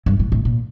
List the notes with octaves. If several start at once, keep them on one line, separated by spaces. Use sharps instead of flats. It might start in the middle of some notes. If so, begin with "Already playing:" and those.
G2
A2
A2
A#2